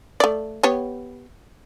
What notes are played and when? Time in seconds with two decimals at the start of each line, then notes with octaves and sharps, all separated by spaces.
0.20 A3 D5
0.63 B3 G4 C#5